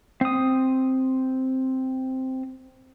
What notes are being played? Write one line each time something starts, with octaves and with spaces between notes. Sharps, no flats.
C4 D#6